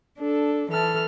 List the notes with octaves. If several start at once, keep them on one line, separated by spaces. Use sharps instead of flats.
D4 A4
E3 A4 A5 F6